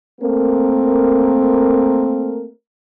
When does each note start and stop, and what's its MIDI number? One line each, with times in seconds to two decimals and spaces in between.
0.20 2.48 57
0.20 2.48 58
0.20 2.48 60
0.20 2.48 70